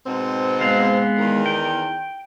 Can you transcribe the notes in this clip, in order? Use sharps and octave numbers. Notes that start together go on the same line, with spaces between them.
G#2 B2 C4
G#3 B3 F5
E2 D#3
G5